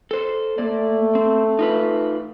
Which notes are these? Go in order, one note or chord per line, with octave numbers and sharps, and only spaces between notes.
A4 C5
A3 A#3 D5
C4
D#4 F4 B4